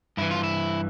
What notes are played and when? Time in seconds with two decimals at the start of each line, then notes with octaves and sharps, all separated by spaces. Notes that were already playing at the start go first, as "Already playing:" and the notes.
0.17 G2 E3 E4
0.31 F4
0.44 E4